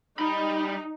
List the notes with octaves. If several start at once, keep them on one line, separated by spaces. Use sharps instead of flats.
G3 D#4 B5